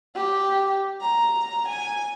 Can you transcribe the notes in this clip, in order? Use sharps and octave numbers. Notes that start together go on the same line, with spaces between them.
G4
A#5
G#5